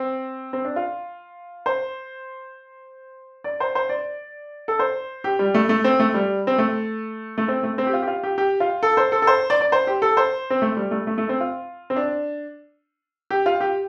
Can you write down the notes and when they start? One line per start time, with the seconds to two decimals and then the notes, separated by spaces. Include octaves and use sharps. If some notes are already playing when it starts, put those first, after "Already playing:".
Already playing: C4
0.53 C4
0.65 D4
0.76 F4
1.66 C5
3.44 D5
3.60 C5
3.75 C5
3.89 D5
4.68 A4
4.79 C5
5.24 G4
5.39 G3
5.54 A3
5.69 A3
5.84 C4
5.99 A3
6.14 G3
6.47 C4
6.58 A3
7.38 A3
7.48 C4
7.63 A3
7.78 C4
7.87 G4
7.93 F4
8.02 G4
8.07 F4
8.23 G4
8.38 G4
8.60 F4
8.83 A4
8.97 C5
9.12 A4
9.22 A4
9.27 C5
9.50 D5
9.61 D5
9.72 C5
9.87 G4
10.02 A4
10.17 C5
10.50 C4
10.62 A3
10.77 G3
10.91 A3
11.07 A3
11.18 A3
11.29 C4
11.40 F4
11.90 C4
11.96 D4
13.30 G4
13.46 F4
13.61 G4